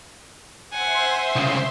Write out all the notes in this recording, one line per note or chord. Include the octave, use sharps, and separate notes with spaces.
C5 E5 F#5 G#5 C6
C2 C#3